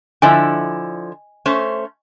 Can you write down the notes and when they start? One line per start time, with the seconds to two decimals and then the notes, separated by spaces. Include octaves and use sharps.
0.22 D3 F3 E4 D#5 G#5
1.46 A3 C#4 C5